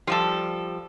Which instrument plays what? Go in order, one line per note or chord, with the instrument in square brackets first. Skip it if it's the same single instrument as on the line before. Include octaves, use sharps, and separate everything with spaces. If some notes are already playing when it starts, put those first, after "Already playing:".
[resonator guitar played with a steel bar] F3 G3 [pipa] F4 A4